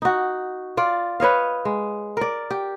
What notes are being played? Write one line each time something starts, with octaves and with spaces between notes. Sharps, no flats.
D#4 F#4
F4 D5
B4 C#5 D#5 F5
G#3
A#4 D5
G4